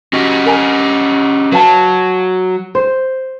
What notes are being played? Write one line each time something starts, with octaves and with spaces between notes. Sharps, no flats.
C#4 F#4 G4 D#5
A#4 G#5 A#5
F#3 B4 F5 A5
C5